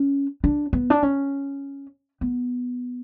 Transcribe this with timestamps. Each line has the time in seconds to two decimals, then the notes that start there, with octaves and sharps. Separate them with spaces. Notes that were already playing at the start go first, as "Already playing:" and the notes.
Already playing: C#4
0.44 D4
0.73 B3
0.90 D4
1.03 C#4
2.21 B3